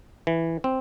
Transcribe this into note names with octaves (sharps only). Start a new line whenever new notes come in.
E3
C4